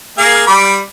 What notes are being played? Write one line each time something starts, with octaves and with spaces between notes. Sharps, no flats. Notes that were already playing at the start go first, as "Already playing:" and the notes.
A#3 G#4 F5
G3 D5 B5